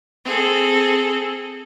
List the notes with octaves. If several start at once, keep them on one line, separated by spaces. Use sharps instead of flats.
C4 G#4 A4